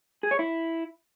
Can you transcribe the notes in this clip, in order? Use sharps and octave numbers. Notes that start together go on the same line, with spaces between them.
G#4
C#5
E4